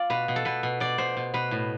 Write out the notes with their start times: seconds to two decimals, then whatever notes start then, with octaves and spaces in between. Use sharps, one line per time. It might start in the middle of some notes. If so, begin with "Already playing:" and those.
Already playing: F4 D5
0.10 B2 B4
0.28 B2
0.36 A4
0.45 B2 B4
0.63 B2
0.80 B2 D5
0.98 B2 C5
1.17 B2
1.34 B2 B4
1.51 A2